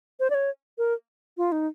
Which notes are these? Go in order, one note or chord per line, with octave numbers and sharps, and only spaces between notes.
C5
D5
C#5
A#4
F4
D#4